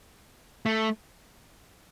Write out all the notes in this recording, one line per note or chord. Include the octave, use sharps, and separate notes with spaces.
A3